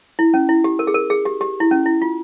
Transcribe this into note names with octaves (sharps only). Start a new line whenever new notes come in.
E4
C#4
E4
G4
A#4
G#4
A#4
G#4
G4
G4
E4
C#4
E4
F4